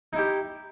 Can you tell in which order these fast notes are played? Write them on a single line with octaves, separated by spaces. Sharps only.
D#4 E4 G4